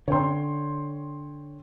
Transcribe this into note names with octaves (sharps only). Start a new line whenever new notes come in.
D3 C#5 G5 C6